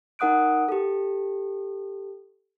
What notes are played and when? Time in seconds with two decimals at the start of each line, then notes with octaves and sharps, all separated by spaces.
0.19 D#4 A#4 F#5 D#6 F#6 D7
0.69 G4 A4